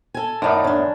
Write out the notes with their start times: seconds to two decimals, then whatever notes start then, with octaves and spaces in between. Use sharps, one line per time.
0.14 A4 G#5
0.42 F#2 A2 D#3 D#4 D5
0.64 C#4 D4